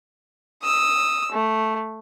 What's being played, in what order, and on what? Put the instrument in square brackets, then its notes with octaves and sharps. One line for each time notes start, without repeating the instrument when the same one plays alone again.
[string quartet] D#6 E6
A3